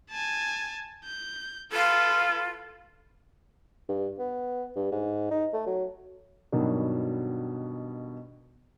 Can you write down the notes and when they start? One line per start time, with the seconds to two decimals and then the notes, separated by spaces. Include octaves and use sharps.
0.11 G#5 A5
1.05 G6
1.72 F4 A4 B4
3.89 G2
4.19 B3
4.76 G2
4.92 G#2
5.31 D#4
5.54 A3
5.67 F#3
6.52 G2 B2 D#3 F#3